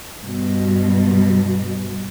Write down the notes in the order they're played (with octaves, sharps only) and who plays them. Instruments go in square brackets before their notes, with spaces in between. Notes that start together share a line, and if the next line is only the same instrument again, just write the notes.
[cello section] G2 B2